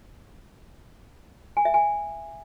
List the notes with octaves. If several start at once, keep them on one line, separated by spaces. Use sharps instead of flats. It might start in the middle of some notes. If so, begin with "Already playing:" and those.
G#5
E5
G#5